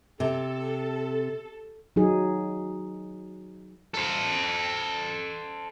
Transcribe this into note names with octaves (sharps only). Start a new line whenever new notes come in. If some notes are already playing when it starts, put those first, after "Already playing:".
C3 A4
F#3 D#4 G#4
A4 C5